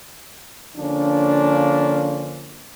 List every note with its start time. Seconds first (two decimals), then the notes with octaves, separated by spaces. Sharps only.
0.77 D3 F3 A#3 C#4 D4